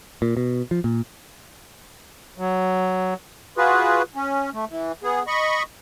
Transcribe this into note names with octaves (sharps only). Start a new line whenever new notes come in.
A#2
B2
F3
A#2
F#3
F4 F#4 G#4 B4
C#4
A3
E3
B3 G#4
D#5 B5 C#6